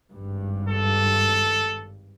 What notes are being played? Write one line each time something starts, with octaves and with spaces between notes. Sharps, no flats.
G#1 G2
A4